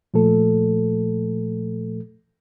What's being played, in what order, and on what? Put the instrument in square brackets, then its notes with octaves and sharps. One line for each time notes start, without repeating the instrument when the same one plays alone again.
[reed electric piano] A#2 F3 A3 A4